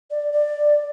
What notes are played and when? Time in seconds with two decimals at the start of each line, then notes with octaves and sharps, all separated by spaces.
0.11 D5
0.33 D5